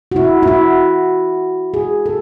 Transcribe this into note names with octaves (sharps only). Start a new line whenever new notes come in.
F#4
E4
E4
F#4
G#4
A4